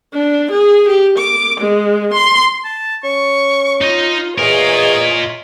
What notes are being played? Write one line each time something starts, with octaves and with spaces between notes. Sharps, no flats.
D4
G#4
G4
D6
G#3
C6
A5
C#4 C#6
D#4 F4 D#5
E2 F4 G#4 A#4 C#5 D#5 G#5